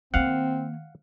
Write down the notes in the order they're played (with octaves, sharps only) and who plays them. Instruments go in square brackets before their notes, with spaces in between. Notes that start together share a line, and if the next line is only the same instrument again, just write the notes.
[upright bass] D#3 A#3 [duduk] C4 [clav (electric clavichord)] F5 F#5